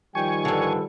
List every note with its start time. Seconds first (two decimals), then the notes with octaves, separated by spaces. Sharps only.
0.15 D#3 F3 G3 G5 G#5 C#6
0.45 G2 D3 A4